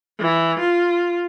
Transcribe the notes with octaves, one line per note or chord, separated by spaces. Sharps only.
E3
F4